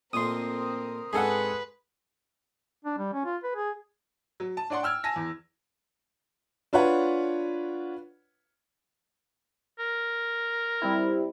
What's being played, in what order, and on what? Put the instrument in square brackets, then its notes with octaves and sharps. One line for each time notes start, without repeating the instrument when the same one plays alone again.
[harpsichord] F2 A#2 A3 [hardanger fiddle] C4 A#4 [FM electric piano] C6 D#6
[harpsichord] G#2 C4 D4 [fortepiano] G#4 A4 F#5 [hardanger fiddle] B4
[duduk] D4
G3
C#4
F4
B4
G#4
[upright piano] F#3
A5
D4 C#5 D5 F#5 C6
G5 E6 F6 G#6
G#5 A5 A#6
E2
D4 F4 B4 C#5 F#5
[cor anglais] A#4
[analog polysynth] G3 C4 E4